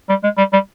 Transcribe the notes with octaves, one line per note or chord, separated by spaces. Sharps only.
G3
G#3
G3
G3